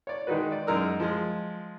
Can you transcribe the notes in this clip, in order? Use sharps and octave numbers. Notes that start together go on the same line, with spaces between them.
C#5 D5
D#3 G#3 D#4 F#4 B4
D5
F#2 G#3 D#4 A#4 E6
F3 G#3